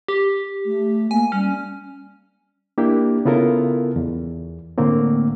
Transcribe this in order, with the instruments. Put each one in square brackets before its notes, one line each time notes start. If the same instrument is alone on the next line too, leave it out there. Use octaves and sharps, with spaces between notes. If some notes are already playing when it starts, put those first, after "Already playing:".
[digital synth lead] G4
[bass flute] A3
[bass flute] A#3 [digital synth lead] G#5
[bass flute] G3 [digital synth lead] C#4
[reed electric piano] A#3 D4 E4 G4
C#3 B3 E4 F4 A4 A#4
E2
A2 D3 A3 A#3 C4